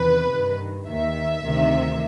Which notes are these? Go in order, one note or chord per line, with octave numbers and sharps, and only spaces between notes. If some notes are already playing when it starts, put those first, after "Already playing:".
Already playing: E2 C3 D#3 B4
G2 D#3
D#2 D#3 E5
D2 C3 D#3